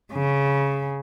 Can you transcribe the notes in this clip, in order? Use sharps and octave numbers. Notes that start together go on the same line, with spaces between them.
C#3